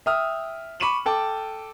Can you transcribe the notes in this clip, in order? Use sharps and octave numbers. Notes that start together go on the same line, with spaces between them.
E5 G5 D#6 F6
B5 C#6 D6 D#7 E7 F#7
A4 G5 A5 D6